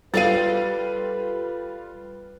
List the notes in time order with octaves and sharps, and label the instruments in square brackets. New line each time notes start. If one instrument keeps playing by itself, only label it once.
[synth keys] G3 F4 [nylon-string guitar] A4 D5 F5 [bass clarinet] B4 [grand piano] A6 D#7